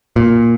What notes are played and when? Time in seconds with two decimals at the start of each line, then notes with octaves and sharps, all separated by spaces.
0.16 A#2